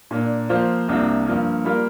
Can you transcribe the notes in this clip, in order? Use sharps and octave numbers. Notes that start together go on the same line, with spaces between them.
A#2 A#3 D4
F3 A#3 F4 C5
C2 C3 A#3 D4
G2 F3 A#3
G3 A#3 F4 A#4